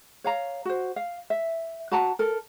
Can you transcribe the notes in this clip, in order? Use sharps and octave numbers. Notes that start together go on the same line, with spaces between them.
C#5 F5 A#5
F#4 C5
F5
E5
F#4 F#5 A5 A#5
A4 A#4